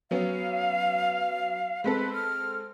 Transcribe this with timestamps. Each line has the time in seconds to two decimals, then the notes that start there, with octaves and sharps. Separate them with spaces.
0.11 F#3 B3 C#4 F5
1.84 G#3 C4 A4 B4
2.13 F6